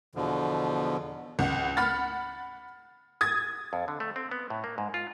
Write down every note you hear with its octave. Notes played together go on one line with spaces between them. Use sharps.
E2 B2 D3 F3
C#2 F#5
F#5 B5 F6 A6
D#6 G#6 A6
F2
D3
A3
C4
B3
A2
A#3
G#2
F4